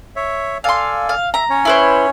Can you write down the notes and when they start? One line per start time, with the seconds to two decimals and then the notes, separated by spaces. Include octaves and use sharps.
0.16 C#5 E5
0.64 A4 D5 F5 G#5 C6
1.09 F5
1.34 E5 A#5
1.50 C#4 C#5
1.65 E4 B4 C5